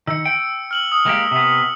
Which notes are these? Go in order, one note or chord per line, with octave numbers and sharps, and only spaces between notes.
D#3 E6 C#7
G5
F6 F#7 G7
D#6
G#3 A#3 G4
C3 B3